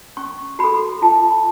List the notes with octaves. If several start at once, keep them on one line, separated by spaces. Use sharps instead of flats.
C#4 C#6
F#4 A4 B5
F4 A5